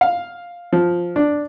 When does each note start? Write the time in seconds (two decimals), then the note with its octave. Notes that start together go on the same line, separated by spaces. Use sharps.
0.01 F5
0.73 F3
1.16 D4